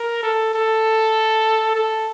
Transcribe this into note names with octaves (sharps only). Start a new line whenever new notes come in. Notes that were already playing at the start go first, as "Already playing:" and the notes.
Already playing: A#4
A4
A4
A4